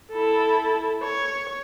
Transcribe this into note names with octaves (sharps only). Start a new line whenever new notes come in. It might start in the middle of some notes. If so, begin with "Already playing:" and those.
E4 A4
C#5